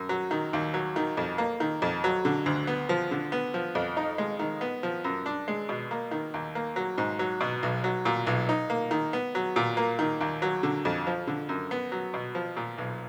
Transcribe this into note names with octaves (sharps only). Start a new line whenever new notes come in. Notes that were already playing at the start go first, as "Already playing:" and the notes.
Already playing: F#2
F#3
D#3
D#2
F#3
D#3
F2
A#3
D#3
F2
F#3
D3
D2
B3
F3
D3
B3
F3
F2
D#4
G#3
D#3
B3
F3
F#2
D4
G#3
B2
A#3
D#3
D#2
A#3
F#3
G#2
F#3
B2
B1
F#3
A#2
B1
D#4
A#3
D#3
B3
F#3
A#2
A#3
D#3
D#2
F#3
D3
F2
F3
D3
F#2
B3
F#3
B2
F3
A#2
B1